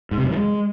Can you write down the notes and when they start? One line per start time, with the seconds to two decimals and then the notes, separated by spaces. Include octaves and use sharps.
0.11 G#2
0.18 C3
0.24 F#2
0.30 D#3
0.37 G#3